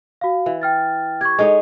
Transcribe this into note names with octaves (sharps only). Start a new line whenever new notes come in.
F#4 F5
E3
G5 F6 A6
G4 C#6 G#6
G#3 D#4 A4 C#5